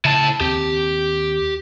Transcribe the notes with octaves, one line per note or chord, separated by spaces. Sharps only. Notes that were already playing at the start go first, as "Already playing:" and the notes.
C#3 E4 A5
D#2 C4 G4